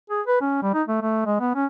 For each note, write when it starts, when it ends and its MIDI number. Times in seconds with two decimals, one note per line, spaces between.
0.10 0.22 68
0.27 0.38 71
0.41 0.62 61
0.62 0.70 55
0.74 0.83 63
0.88 0.99 57
1.02 1.22 57
1.26 1.37 56
1.40 1.52 59
1.55 1.66 61